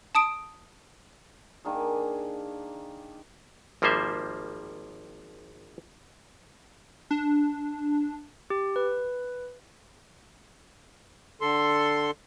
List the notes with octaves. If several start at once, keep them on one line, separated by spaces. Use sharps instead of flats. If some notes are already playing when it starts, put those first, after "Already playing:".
A5 D#6 D7
D#3 A#3 D4 G#4
G#1 F3 G3 A#3 C5 E5
D4
G4
B4
D3 A4 C6